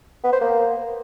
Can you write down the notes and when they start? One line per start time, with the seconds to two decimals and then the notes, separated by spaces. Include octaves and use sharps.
0.24 B3
0.32 C5
0.41 A#3